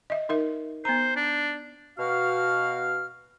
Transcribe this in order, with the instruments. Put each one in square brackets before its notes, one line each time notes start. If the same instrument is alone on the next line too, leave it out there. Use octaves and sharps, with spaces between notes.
[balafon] D#5 E5
D#4 A#4 E5
[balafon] B3 A#5 [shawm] C5
[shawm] D4
[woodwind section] B2 F#4 F5 F6